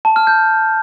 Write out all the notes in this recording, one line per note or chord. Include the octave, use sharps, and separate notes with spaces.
A5
F6
G6